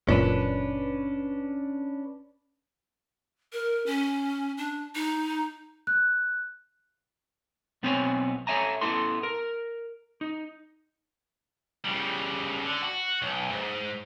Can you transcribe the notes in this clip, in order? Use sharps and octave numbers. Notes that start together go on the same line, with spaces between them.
F#1 A#2 C#4 D4 B4
A#4
C#4
D4
D#4
F#6
B1 B3 C4 B4 C#5 G#5
A4 C5 C#5 E5 G#5 A#5
B3 E4 A4 C6
A#4
D#4
C#3 G3
D3
F#4
B1
G#2